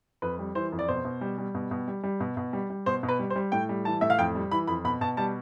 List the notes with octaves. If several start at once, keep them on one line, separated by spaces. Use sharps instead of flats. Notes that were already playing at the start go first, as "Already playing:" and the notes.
F2 B4
G3
E3 C5
F2
D5
B2 C5
B2
G3
G3
B2
B2
G3
G3
B2
B2
G3
G3
B2 C5
B2
B4
G3
C5
G3
A2 G5
G3
E3 A5
A2 E5
F5
F2 G5
G3
E3 B5
F2 B5
B2 B5
B2 A5
G3 A5